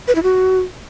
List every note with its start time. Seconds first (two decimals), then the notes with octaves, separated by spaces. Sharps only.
0.07 B4
0.15 E4
0.23 F#4